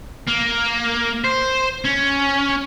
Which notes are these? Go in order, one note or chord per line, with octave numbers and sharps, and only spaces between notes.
A#3
C5
C#4